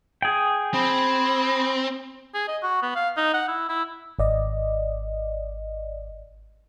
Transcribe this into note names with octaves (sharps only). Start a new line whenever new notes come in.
G#4 G5
C4 B5
G#4
D#5
F#4
B3
F5
D#4
F#5
E4
E4
G#1 D5 D#5